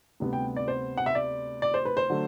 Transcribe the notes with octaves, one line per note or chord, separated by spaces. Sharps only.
D2 C3 G3 B3
G5
D5
C5
F#5
E5
D5
D5
C5
B4
C5
D3 F#3 A3